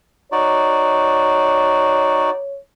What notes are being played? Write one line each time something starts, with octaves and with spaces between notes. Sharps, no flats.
D#4 F#4 C#5 D5